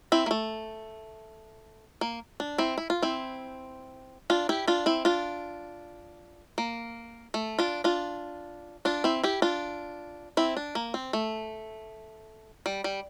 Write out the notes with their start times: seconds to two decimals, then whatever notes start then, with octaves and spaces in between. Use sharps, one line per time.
0.12 C4 E4
0.26 A#3
0.31 A3
2.01 A#3
2.40 D4
2.58 C4 E4
2.78 E4
2.90 F4
3.02 C4 E4
4.30 D4 F4
4.49 E4 G4
4.68 D4 F4
4.86 C4 E4
5.05 D4 F4
6.58 A#3
7.34 A3
7.59 D4 F4
7.84 D4 F4
8.85 D4 F4
9.04 C4 E4
9.23 E4 G4
9.42 D4 F4
10.37 C4 E4
10.57 D4
10.75 A#3
10.94 C4
11.13 A3
12.66 G3
12.84 G3